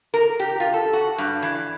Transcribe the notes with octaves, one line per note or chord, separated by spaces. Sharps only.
A#4
G4
F4
A4
F#4
G2
E3